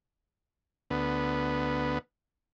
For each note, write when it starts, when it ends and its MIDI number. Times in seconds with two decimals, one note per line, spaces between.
0.90 1.98 38
0.90 1.98 59